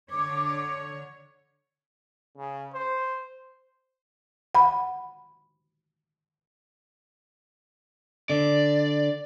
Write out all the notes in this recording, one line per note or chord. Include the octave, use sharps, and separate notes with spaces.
D3 C#5 D6
C#3
C5
F#5 B5
D3 D5